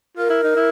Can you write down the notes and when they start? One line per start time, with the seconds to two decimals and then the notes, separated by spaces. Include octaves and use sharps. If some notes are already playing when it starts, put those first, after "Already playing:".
0.17 F4 A#4
0.30 E4
0.44 D#4
0.56 E4